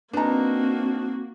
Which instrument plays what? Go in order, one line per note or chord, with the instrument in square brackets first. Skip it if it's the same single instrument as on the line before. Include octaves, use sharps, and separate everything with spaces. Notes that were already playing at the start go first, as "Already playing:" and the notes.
[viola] A#3 F#4 [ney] C4 [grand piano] D4 D#4 [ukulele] B4 A#5